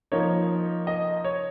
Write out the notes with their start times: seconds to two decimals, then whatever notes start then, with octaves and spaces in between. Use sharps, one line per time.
0.12 F3 A#3 D#4 C#5
0.87 D#5
1.25 C#5